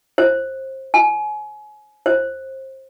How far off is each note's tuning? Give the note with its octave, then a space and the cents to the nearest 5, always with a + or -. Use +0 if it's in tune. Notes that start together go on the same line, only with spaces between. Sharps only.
C5 +25
G#5 +30
C5 +25